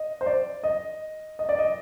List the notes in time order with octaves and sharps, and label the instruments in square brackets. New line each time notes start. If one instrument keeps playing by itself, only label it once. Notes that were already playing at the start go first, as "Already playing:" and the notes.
Already playing: [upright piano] D#5
C5
D5
D#5
D#5
D5
D#5